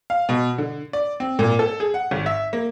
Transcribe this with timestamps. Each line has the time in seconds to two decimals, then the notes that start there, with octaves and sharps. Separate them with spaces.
0.10 F5
0.29 B2
0.58 D3
0.93 D5
1.20 C4
1.39 A#2
1.59 A4
1.80 G#4
1.94 F#5
2.11 G#1
2.26 E5
2.53 A#3